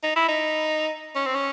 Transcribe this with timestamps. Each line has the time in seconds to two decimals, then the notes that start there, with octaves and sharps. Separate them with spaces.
0.03 D#4
0.16 E4
0.28 D#4
1.15 C#4
1.26 C4
1.35 C#4